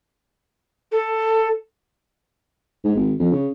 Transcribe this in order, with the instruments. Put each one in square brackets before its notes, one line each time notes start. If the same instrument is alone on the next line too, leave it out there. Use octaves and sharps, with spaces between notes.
[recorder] A4
[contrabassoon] G#2
G#1
F2
C#3